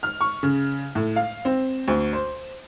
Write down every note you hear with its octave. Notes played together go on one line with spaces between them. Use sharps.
F6
C#6
C#3
A2
F5
C4
D2
C5